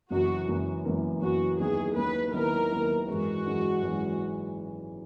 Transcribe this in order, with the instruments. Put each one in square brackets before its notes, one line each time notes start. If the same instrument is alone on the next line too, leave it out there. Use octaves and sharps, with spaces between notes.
[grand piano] F#1 F#2 E3 A#3 [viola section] F#4
[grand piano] F#1 F#2 E3 A#3
F#1 F#2 E3 A#3
[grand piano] F#1 F#2 E3 A#3 [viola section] F#4
[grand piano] D#2 D#3 F#3 B3 E4 [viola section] G#4
[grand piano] D#2 D#3 F#3 B3 E4 [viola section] B4
[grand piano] D#2 D#3 F#3 B3 E4 [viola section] A#4
[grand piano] D#2 D#3 F#3 B3 E4
[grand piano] G#1 F#2 E3 G#3 [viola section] F#4
[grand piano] G#1 F#2 E3 G#3
G#1 F#2 E3 G#3